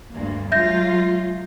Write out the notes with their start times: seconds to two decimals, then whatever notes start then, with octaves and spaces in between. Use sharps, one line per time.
0.14 D2 G2 A#3
0.52 F#3 G#3 F4 E5 G6 A#6